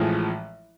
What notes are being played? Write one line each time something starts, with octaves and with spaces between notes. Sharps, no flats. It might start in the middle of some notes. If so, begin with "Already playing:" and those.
Already playing: A1 A2 F3 G#3